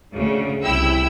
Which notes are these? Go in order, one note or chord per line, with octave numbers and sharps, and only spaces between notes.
D2 C#3
C2 E4 G5 E6